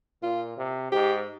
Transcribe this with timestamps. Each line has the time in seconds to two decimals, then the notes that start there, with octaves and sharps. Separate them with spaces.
0.23 A#2 F4
0.57 C3
0.92 G#2 G4